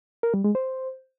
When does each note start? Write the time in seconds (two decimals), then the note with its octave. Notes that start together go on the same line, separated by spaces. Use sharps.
0.23 A#4
0.34 G3
0.44 G#3
0.55 C5